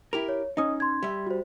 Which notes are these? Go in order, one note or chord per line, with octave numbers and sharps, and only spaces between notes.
E4 G4 A#4 F7
C#5
C#4 D#4 D#5 D#6
C6 G#6
G3 E5
F#4 C5